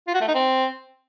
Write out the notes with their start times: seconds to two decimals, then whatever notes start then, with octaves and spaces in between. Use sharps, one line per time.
0.07 F4
0.14 F#4
0.21 A3
0.28 D#4
0.35 C4